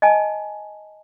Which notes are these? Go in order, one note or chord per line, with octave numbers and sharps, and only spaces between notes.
D#5 G#5 A5